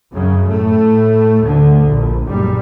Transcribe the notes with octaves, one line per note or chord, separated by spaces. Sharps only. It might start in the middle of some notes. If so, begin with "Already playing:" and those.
F#2 C#3
A2 A3
D2 D3
A#1
F#1 A#2 G3